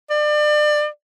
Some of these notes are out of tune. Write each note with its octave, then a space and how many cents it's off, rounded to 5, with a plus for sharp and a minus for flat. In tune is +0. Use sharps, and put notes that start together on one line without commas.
D5 +30